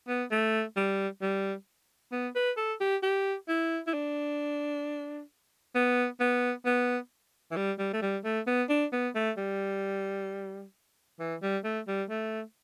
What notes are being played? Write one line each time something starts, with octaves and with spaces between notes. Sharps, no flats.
B3
A3
G3
G3
B3
B4
A4
G4
G4
E4
E4
D4
B3
B3
B3
E3
G3
G3
A3
G3
A3
B3
D4
B3
A3
G3
E3
G3
A3
G3
A3